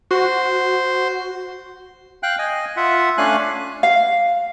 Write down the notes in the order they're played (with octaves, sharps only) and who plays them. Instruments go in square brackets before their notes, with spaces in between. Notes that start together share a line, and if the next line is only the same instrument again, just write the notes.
[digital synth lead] F#4 [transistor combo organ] C5
[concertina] F5 G5 F#6
D#5 G#5
F4 E5 F#5
A3 C#4 D4 F5 G#5 F#6
[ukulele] F5